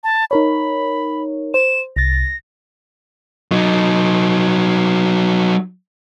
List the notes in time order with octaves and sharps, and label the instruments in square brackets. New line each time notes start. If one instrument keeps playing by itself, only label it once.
[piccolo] A5
[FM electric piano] D#4 A#4 C#5 [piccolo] B5
[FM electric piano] C5 [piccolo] E7
[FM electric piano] C2 A6 [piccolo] A#6
[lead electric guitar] F#3 D#4